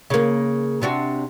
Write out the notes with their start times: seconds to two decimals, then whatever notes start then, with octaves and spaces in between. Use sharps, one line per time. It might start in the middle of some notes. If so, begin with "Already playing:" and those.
0.10 C#3 A#3
0.82 C3 D4 F#4